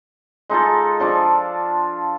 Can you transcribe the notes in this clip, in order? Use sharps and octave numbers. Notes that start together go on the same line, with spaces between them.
G#3 D#4 F4 A4
F3 D4 A5 D6